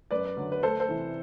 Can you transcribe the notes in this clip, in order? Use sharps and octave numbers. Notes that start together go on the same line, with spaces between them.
F#2 B4 D5
D3 F#3
B4
D2 A4 C5
A4 C5
C3 E3